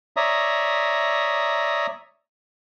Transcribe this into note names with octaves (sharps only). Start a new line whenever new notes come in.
C#5 D5 E5 A#5 D#6